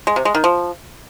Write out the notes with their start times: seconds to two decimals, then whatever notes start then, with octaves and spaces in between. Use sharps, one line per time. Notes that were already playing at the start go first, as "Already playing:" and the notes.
0.07 G#3
0.16 C3
0.25 G#3
0.35 D#3
0.44 F3